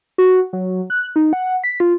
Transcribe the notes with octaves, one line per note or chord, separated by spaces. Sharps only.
F#4
F#3
F#6
D#4
F#5
B6
F4